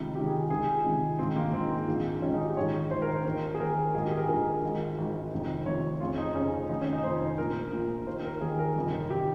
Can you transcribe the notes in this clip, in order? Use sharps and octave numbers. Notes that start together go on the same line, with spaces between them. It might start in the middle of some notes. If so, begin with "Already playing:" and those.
Already playing: C#2 C3 D#3
C#2 C3 D#3 G4
G#4
C#2 C3 D#3 G#4
C#2 C3 D#3
A#1 G#2 D#3 C4
A#3
A#1 G#2 D#3 C4
A#1 G#2 D#3
A#1 G#2 D#3 C#4
D#4
G4
A#1 G#2 D#3 C#5
A#1 G#2 D#3 C5
A#4
C5
D#2 D#3
G#4
D#2 D#3 A#4
A#1 G#2 D#3 G#4
G4
G#4
A#4
A#1 G#2 D#3 A#4
G#1 G#2 D#3
G#1 G#2 D#3
F1 F2 C3 D#3
F1 F2 C3 D#3 C#5
F1 F2 C#3 F4
D#4
F1 F2 C#3 C#4
F1 F2 D#3 D#4
C#4
D#4
F1 F2 D#3 C5
A#1 A#2 A#4
A#1 A#2
D#2 D#3 C5
A#4
D#2 D#3 G#4
A#4
G1 F2 C3 D#3
C3 D#3 G4